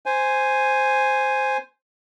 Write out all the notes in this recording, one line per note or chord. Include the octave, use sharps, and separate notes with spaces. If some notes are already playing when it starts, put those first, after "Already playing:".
C5 G#5